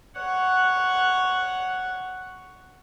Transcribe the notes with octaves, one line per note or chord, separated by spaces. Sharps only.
C#5 F#5